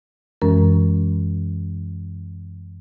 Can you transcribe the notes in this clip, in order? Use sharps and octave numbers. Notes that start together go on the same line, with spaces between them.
F#2 E3 G#3 C#4 A#4